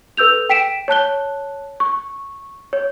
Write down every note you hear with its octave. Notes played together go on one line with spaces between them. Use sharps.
A4 B4 E6 G6 F7
G5 B6 D7 E7
C#5 A5 F#6 G7
C#6
C#5